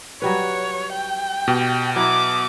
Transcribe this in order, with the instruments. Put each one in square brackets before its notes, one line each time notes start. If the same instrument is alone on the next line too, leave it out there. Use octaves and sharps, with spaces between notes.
[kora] F#3 G3 B4 [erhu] C#5
[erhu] G5
[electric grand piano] B2 [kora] G4
[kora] F#3 E4 [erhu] D6